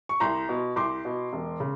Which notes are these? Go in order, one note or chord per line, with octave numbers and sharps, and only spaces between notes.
C#6
C2 A#5 C6
B2
C2 C6 D6
B2
E1
C#3